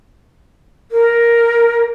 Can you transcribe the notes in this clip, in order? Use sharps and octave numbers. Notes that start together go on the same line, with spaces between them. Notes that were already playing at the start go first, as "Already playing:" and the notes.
A#4